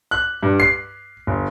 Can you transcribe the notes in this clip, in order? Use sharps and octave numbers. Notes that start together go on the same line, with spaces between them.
F#6
G2
C7
G1